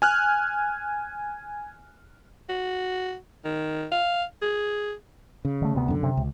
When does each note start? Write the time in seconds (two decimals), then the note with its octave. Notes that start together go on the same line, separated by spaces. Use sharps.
0.02 G#5 F6 F#6
2.49 F#4
3.45 D#3
3.92 F5
4.42 G#4
5.45 C#3
5.62 D3 A3
5.75 D2 C3 B3
5.88 F#2 D3
6.03 C3
6.17 C#2